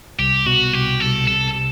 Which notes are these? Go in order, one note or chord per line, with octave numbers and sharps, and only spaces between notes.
C2 G4
B2 F#4
C2 G4
C2 A4
C3 A4
C3